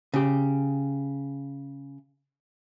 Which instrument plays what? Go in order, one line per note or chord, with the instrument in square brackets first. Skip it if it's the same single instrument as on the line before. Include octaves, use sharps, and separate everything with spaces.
[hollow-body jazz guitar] C#3 G4